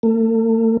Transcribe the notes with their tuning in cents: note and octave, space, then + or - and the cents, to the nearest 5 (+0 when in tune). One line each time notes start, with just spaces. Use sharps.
A3 +45